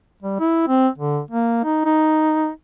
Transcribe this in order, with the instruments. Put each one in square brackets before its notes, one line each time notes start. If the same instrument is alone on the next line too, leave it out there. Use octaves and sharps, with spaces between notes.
[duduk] G3
E4
C4
D3
A#3
D#4
D#4